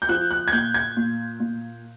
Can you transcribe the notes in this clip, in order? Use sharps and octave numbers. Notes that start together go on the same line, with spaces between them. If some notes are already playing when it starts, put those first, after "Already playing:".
G6
F3 F#6
F#6
G#6
A#2 G6
G#6
A#2
A#2